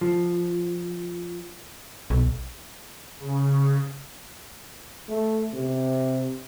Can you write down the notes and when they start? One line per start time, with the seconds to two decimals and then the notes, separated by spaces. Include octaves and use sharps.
0.01 F3
2.10 B1
3.20 C#3
5.09 A3
5.54 C3